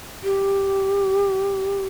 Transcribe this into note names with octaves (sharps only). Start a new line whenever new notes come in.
G4